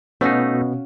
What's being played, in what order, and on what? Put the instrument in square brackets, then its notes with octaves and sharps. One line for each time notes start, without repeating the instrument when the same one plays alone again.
[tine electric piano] B2 B3 [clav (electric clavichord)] A3 D#4 [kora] C#4 F#4 F5